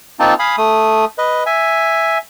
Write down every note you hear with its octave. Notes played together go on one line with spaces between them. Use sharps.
A#3 C4 D#4 F4 A5
F5 G#5 B5 D#6
A3 D#6
B4 D#5
E5 G#5